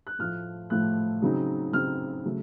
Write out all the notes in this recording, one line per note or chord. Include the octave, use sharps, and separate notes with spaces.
F#6
A2 F3 A3 F6
A2 F3 A3 F#6
C#3 F#3 C4 D#4
C#3 F#3 C4 D#4 F6
C#3 F#3 A3